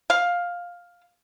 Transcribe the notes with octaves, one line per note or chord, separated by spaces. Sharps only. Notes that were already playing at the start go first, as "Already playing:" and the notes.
F5